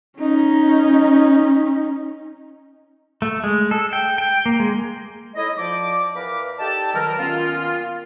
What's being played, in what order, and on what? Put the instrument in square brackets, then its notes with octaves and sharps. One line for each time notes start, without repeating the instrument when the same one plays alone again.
[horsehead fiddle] C#4 D#4
[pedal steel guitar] A3
G#3
A4
G5
G5
A#3
G#3
[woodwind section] D#4 E4 A4 C#5 D#5
F3 D5 D6
E2 A#4 B4 F5 B5 D6
D#4 G4 A4 D5 G5 A5
B2 D#3 F#3 G3 A4 A#4
A#2 D#3 B3 C#4 F4